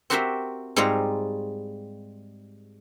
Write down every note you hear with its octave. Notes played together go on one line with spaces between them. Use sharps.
C4 F#4 G4 A#4 C5 E5
G#2 G3 C4 F4 C#5 A#5